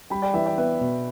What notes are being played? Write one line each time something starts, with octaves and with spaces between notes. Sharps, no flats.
G3 G5 B5
D5 G5
E3 B4 E5
D5 G5
B3 B4 E5
B2